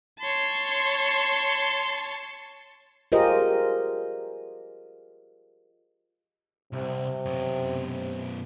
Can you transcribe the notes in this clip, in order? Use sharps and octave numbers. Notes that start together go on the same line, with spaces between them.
C#5 A5 C6
F4 G4 G#4 A#4 C5 D#5
C2 C3
F#2 B2